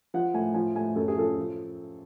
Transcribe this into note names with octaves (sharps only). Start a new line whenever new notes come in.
F3 F#5
A2 G#5
F3 G#5
A2 G#5
F#2 A4
G#4
F3 A4
F3